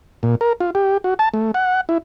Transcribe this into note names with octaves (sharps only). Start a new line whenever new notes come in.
A#2
A#4
F4
G4
F#4
A5
A3
F#5
E4